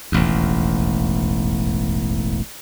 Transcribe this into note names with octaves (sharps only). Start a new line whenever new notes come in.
E1 A1 D#2